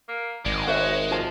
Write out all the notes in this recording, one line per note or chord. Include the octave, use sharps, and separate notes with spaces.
A#3
G#1 G#3 D5
F#4 C5 C#5 E5
F3 F#4 A5